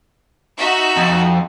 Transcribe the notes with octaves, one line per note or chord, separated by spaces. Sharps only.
D#4 F#4 E5
F2